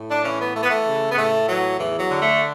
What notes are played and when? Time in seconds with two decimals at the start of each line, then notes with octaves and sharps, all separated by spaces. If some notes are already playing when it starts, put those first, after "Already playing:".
Already playing: A2
0.09 D4
0.24 E3 C#4
0.39 B3
0.55 E3 A3
0.62 B3
0.69 A3
0.86 C#3
1.12 B3
1.16 A2 A3
1.47 E3 F#3
1.79 E2 E3
1.99 F#3
2.10 D3
2.20 A3